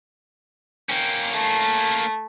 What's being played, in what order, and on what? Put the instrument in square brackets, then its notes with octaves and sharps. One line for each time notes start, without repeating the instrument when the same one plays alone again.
[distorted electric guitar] A#3 C#4 [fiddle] G5
[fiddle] A3